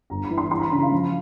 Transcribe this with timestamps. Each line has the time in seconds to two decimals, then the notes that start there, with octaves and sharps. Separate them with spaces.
0.10 G1 A#5
0.24 B5
0.31 E3
0.38 C6
0.51 E3 C6
0.58 A#5
0.61 B5
0.72 C#3 A#5
0.82 F5
0.92 F3